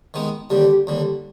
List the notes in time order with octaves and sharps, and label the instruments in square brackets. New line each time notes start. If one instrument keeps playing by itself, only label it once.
[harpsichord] D#3 G#3 B3 D#4
[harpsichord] D#2 D3 G3 [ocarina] G4
[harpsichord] D#2 D3 G3